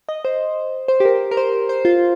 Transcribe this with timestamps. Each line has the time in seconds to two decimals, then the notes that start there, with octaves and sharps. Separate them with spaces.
0.09 D#5
0.25 C5
0.88 C5
1.00 G4
1.05 A#4
1.31 A#4
1.37 C5
1.69 C5
1.85 F4